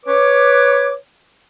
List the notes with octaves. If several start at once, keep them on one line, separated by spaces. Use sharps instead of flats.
B4 C#5 D6